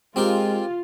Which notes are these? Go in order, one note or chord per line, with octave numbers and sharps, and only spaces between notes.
G#3 C4 F4 G4 A#4